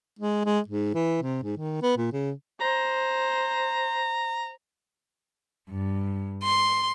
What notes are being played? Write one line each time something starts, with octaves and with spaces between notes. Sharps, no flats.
G#3
G#3
G#2
E3
C3
G#2
D#3
B3
A#2
C#3
C5 A#5
G2
C6